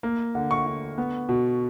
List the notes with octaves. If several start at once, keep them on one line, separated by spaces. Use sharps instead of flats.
A#3
D3
C#6
D3
B3
B2